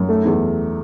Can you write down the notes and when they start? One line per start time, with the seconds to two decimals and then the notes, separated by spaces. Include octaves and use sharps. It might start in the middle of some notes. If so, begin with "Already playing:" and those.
Already playing: F#2
0.09 A3
0.25 E2